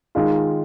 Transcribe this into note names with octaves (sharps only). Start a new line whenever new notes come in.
D#3 G#3 F4